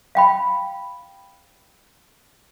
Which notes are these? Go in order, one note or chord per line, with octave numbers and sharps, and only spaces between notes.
F5 G5 B5